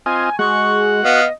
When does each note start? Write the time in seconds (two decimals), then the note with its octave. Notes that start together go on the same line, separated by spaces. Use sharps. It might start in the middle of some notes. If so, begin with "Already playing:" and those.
0.06 C4 F4 D#5 G#5
0.39 G#3 F#4 F#5 C#6
1.05 B3 D#5 F5